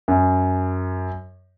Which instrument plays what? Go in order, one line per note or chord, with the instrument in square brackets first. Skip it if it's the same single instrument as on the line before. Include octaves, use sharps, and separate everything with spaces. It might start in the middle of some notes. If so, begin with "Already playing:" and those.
[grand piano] F#2